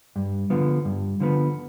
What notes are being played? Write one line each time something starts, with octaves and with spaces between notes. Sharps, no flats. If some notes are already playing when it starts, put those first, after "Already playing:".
G2
D3 F3 B3
G2
D3 F3 B3